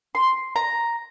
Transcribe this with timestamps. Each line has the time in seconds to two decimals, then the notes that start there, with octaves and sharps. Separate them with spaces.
0.15 C6
0.56 A#5